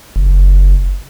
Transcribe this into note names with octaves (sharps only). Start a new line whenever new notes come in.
F#1